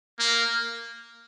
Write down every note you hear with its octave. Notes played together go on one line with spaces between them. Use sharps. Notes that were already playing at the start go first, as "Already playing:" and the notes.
A#3